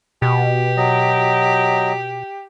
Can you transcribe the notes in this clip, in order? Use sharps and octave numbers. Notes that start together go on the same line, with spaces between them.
B2 G4
F#3 D#5